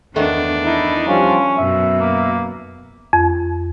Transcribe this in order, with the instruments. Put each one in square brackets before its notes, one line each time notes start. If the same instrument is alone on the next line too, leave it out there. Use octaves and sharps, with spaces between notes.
[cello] E2 D4 [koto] D#3 A3 B3
[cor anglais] D#4 [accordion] E4
[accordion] F3 G3 F4 [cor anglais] C#4
[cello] F#2 B2 [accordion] E5
[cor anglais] A#3
[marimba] F2